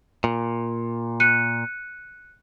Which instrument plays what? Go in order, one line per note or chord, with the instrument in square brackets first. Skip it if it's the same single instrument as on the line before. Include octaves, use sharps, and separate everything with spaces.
[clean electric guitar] A#2
[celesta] F#6 C#7 D#7